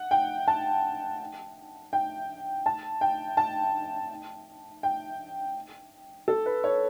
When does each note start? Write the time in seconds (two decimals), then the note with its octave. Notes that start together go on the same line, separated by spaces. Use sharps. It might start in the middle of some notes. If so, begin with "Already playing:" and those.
Already playing: F#5
0.11 G5
0.48 A5
1.93 G5
2.66 A5
3.01 G5
3.37 A5
4.83 G5
6.28 A4
6.46 B4
6.64 C#5